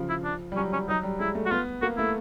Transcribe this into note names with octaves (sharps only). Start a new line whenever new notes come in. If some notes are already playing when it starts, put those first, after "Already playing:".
Already playing: C#3 F3
E4
D4
G3
F#3 C#4
C#4
F#3 D#4
G3
G#3 E4
A3
F#4
B3 F4
A#3 F#4
A3 E4